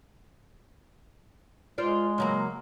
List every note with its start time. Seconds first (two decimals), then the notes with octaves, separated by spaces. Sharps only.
1.78 G#3 F4 C5 D5
2.18 C#3 F#3 A#3